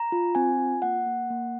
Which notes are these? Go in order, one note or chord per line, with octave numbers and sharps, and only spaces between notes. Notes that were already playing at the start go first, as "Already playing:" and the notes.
Already playing: A#5
F4
C4 G#5
F4
A#3 F#5
A#3
A#3